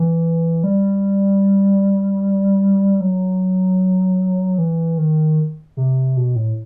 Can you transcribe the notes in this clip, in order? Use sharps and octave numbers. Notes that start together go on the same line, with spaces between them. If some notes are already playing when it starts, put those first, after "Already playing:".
Already playing: E3
G3
F#3
E3
D#3
C3
B2
A2